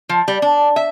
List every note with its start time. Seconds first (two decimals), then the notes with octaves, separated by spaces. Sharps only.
0.09 F3
0.28 G3
0.42 D4
0.76 E5